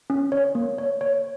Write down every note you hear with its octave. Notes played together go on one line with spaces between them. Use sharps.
C#4
C#5
A#3
C#5
C#5